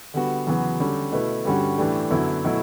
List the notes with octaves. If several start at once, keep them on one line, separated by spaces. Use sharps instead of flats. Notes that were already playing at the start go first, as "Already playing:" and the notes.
D3 G3 B3 F#4
E2 C#3 F#3 B3 F#4
D3 G3 C#4 G4
B2 A3 E4 B4
G2 D3 G3 C#4 F#4
A2 E3 A3 D4 G4
F#2 D3 F#3 B3 E4
B2 F#3 A3 E4